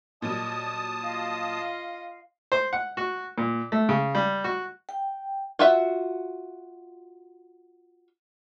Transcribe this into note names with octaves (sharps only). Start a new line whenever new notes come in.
A#2 F#3 G3 D#5 A5 D#6
F4 D#5 F5
C5
F#5
F#4
A#2
A3
C#3
G3
F#4
G5
F4 F#4 E5